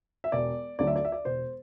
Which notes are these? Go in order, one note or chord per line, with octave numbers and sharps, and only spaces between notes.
E5
E1 D5
D2 D3 F#3 D5
E5
D5
E5
D5
E1 C5